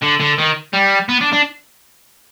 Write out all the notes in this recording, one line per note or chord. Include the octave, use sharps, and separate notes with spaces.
D3
D3
D#3
G3
B3
D4
D4